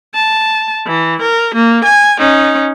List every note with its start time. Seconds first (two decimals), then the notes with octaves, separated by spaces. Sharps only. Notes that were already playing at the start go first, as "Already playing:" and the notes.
0.14 A5
0.87 E3
1.22 A#4
1.55 A#3
1.84 G#5
2.19 C#4 D#4